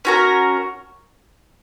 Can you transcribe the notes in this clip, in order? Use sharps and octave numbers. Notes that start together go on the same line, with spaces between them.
C#4 F#4 A#4